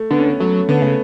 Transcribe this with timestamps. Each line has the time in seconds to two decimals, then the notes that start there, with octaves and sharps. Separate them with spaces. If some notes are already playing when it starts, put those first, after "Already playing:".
Already playing: A3
0.11 D3 B3
0.18 C#4
0.27 B3
0.40 F#3 A3
0.68 D3 B3
0.82 C#3 A3